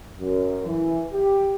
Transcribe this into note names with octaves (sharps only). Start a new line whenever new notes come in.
F#2
E3
G4